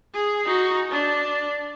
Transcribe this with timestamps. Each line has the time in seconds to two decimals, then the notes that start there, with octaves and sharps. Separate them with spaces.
0.14 G#4
0.45 D#4 F#4
0.91 D4